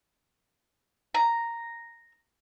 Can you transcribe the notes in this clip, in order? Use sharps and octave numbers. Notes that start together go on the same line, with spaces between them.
A#5